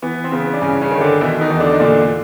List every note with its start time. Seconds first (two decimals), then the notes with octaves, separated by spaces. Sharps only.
0.02 E3 B3
0.24 C4
0.32 C#3 B3
0.53 D4
0.61 G2 C#3 C#4
0.82 C#3 C#4
0.91 D#3
1.01 D3 D4
1.21 B2 E3 E4
1.41 D#3 D#4
1.50 E2
1.60 D3 D4
1.72 D#4
1.80 A#2 D3 D4